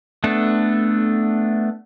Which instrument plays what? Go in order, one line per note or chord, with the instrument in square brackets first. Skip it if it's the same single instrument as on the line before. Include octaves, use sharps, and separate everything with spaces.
[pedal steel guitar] A3 B3 D4 A4